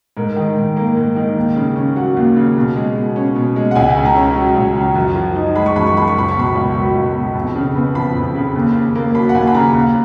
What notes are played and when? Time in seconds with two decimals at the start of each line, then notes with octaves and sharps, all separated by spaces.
0.17 G#2 A#4
0.36 D#3
0.56 G#2
0.77 A#3 A#4
0.97 G#2
1.16 D#3
1.37 D#2
1.56 C#3
1.76 C#4
1.96 F#3 F#5
2.17 D#2
2.36 C#3
2.57 B2
2.76 G#3
2.96 B2
3.16 C#4
3.36 B2
3.56 G#3
3.71 F#5
3.75 C#2 G#5
3.97 C#3
4.05 A#5
4.16 C#4
4.36 F#3
4.56 C#2
4.76 C#3
4.95 F#2
5.16 F3
5.35 D#4
5.55 G#3 B5
5.66 C#6
5.76 F#2 B5
5.87 C#6
5.96 F3 B5
6.08 C#6
6.15 C#2 B5
6.29 C#6
6.36 B2 B5
6.55 C#2
6.75 F#3 C#6
6.95 C#2
7.15 B2
7.35 F2
7.55 C#3
7.75 B3
7.95 F3 B5
8.15 F2
8.35 C#3
8.55 D#2
8.75 C#3
8.95 A#3
9.15 F#3 B5
9.29 F#5
9.34 D#2 G#5
9.47 B5
9.54 C#3 A#5
9.75 D#2